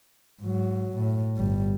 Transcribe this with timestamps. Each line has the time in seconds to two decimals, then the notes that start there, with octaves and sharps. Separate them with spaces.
0.43 G#2 F#3
0.97 A2
1.38 G1 G3